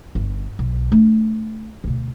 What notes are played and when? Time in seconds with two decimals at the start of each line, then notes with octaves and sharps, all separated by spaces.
0.15 G1
0.59 B1
0.92 A3 D4
1.84 D2 B2